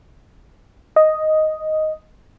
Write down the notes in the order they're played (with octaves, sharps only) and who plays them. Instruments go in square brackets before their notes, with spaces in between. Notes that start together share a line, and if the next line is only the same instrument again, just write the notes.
[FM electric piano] D#5